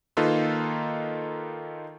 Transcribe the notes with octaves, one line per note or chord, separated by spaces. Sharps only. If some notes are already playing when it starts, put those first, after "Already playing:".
D#3 A#3 D#4 F4 A4 B4